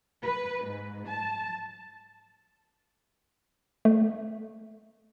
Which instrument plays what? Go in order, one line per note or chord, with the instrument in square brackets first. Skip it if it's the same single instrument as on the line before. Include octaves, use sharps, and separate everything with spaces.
[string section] B4
G#2
A5
[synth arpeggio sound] A3